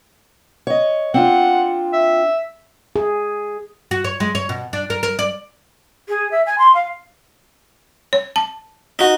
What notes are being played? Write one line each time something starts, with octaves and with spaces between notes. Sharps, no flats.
C#5 D#5
C4 D4 F4 F#5
E5
G#4
F#4
C#5
G#3
C#5
B2
D4
A#4
A#4
D5
G#4
E5
G#5
C6
F5
C#5
A5
D#4 F#4